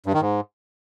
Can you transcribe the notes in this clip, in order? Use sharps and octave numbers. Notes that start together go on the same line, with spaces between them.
G2
D#3
G#2